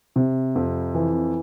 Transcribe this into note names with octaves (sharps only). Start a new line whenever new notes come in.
C3
F2
E3